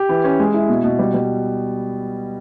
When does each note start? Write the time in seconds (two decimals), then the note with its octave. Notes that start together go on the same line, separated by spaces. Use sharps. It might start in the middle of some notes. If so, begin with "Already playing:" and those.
Already playing: G4
0.09 E3
0.24 C#4
0.39 G#3
0.54 E4
0.69 B2
0.84 B2
0.99 G3
1.14 G3